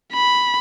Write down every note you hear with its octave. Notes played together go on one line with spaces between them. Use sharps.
B5